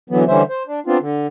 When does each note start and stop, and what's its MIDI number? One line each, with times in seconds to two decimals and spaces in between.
0.10 0.24 50
0.10 0.24 52
0.10 0.24 54
0.10 0.24 59
0.28 0.42 50
0.28 0.42 52
0.28 0.42 55
0.28 0.42 61
0.28 0.42 72
0.28 0.42 76
0.49 0.63 72
0.67 0.80 62
0.87 0.98 59
0.87 0.98 60
0.87 0.98 62
0.87 0.98 65
1.00 1.27 50